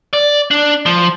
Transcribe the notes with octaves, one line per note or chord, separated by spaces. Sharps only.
D5
D4
F3